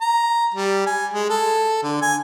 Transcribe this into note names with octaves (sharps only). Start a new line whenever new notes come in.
A#5
G3
G#5
G#3
A4
D3
G#5